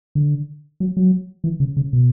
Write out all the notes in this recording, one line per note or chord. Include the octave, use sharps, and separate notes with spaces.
D3
F#3
F#3
E3
C#3
C#3
B2